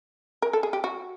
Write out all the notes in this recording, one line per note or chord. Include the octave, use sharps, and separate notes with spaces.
A#4
A4
G#4
G4
F#4